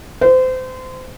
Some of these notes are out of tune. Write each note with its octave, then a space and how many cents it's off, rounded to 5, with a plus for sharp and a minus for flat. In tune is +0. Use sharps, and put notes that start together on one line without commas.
C5 -30